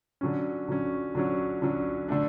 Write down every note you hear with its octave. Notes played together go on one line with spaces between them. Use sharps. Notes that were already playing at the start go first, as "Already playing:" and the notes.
D3 F#3 C#4
D3 F#3 C#4
D3 F#3 C#4
D3 F#3 C#4
D3 A3 D4